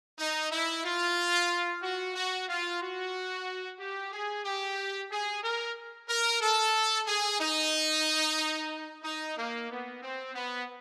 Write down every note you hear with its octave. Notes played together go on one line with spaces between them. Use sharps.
D#4
E4
F4
F#4
F#4
F4
F#4
G4
G#4
G4
G#4
A#4
A#4
A4
G#4
D#4
D#4
A#3
B3
C4
B3